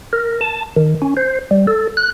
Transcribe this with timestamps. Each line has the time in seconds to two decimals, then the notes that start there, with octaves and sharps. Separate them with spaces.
0.13 A#4
0.41 A5
0.76 D#3
1.02 C#4
1.17 C5
1.51 G3
1.67 A4
1.97 F#6